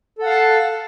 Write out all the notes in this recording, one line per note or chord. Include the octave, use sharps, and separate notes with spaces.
A4 F5 F#5 A5